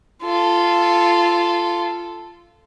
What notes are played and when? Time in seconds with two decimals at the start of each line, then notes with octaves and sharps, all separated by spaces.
0.22 F4 A4